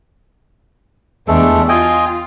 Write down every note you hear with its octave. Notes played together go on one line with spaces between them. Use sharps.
E2 G#3 A3 D4 G4 A4
F4 D#5 G5 G#5